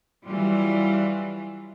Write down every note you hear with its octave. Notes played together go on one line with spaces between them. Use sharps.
E3 F#3 G3 F4